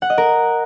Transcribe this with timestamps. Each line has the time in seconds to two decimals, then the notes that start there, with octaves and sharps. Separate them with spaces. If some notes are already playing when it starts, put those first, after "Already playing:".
0.02 F#5
0.10 D#5
0.18 A#4